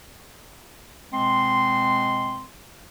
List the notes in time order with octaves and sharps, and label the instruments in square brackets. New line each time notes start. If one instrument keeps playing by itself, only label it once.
[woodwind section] B2 G#3 C4 C6